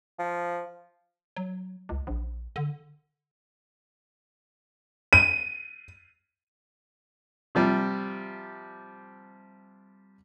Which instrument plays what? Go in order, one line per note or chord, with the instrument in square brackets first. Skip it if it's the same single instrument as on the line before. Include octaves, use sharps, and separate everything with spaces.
[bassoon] F3
[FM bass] F#3
C#2
A#1
D3
[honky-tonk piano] D#7
[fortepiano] C3 F3 G3